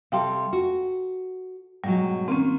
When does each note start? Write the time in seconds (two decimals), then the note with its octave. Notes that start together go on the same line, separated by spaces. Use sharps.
0.12 C3 G3 A4 F5 G5 C6
0.53 F#4
1.84 G#2 B2 F#3 G3
2.28 D#3 A#3 C4 C#4